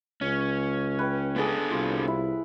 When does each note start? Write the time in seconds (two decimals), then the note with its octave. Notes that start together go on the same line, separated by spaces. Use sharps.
0.21 C#2 C#4
0.99 B4 G5
1.36 B3 D4 G#4 A4 B4
1.71 C2 F4
2.07 E4